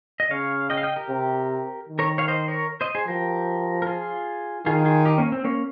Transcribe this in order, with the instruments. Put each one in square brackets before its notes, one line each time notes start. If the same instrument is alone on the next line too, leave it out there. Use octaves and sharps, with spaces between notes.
[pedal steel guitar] D#5
[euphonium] C#3 [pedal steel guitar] C#5 F5
[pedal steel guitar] D#5 G5
F5
D#5 G5
G4 A#4
[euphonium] C3
D#3
[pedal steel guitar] A#4 C#5
C#5 F5
C5 D#5
A#4 C#5
C5 D#5
G#4 C5
[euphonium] F3 [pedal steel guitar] G4 A#4
[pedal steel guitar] A#4
F4 G#4
[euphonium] D#3 [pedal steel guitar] F4 G#4
[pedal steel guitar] F4 G#4
D#4 G4
A#3 C#4
C4
A#3 C#4